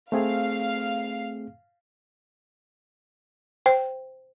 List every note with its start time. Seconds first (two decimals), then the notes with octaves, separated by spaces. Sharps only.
0.12 A3 C4 G#4 F5 C7
3.66 C5 G5